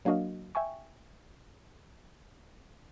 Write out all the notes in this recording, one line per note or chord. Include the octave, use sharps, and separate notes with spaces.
F#3 A#3 D4 F#4 D#5 F5
E5 G5 G#5 C#6